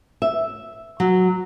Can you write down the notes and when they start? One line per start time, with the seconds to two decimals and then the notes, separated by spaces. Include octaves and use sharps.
0.22 E5
1.00 F#3